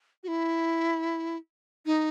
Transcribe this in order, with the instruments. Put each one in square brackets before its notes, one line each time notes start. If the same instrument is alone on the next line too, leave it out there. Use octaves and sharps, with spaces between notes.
[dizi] F#4
E4
D#4